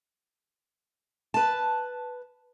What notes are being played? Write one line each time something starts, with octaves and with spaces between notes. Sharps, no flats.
B4 A5